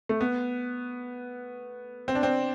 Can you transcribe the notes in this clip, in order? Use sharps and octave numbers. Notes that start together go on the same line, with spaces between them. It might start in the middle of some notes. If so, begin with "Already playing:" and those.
A3
B3
C4
D4
C4